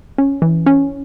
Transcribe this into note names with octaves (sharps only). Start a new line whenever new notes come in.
C#4
E3
C#4